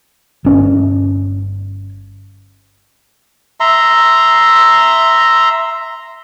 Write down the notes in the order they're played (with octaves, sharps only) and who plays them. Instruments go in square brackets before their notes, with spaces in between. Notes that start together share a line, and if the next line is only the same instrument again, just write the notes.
[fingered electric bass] G1 C#4
[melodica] E5 A#5 C6